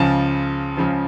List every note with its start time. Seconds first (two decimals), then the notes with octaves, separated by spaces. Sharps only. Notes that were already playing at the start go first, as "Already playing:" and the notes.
Already playing: C#2 C#3 F3 A5
0.77 C#2 C#3 F3